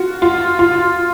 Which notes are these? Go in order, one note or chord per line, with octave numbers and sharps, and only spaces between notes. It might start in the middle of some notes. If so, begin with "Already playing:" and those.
Already playing: F4 F#4
F4
F4